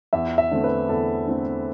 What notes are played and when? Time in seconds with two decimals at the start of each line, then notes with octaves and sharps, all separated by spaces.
0.13 E2 E5
0.38 E5
0.51 D3 A3 C4
0.64 B4
0.89 E2 A4
1.27 D3 A3 C4